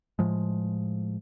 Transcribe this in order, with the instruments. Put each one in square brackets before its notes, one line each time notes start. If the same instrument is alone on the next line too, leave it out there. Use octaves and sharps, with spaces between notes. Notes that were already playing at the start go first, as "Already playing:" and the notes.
[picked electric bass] A2 F3 G#3